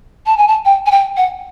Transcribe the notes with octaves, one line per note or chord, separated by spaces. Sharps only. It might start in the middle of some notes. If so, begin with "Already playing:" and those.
A5
G#5
A5
G5
G#5
G5
F#5